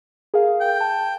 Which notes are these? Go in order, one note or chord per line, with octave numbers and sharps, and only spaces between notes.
G#4 A#4 F5
G5
A5